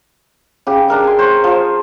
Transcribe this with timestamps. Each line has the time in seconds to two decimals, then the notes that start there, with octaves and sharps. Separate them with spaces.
0.67 C#3 G4
0.88 D4 A#4 E5
1.04 G#5 C6
1.19 C5 C#5
1.44 F3